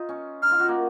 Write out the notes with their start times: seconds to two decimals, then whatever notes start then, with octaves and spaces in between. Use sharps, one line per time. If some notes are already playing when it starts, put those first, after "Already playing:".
Already playing: D#4 F4
0.09 C#4
0.42 D#4 F6
0.51 F4
0.59 F#4
0.68 A#3